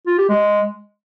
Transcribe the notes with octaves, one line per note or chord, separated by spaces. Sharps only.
F4
G4
G#3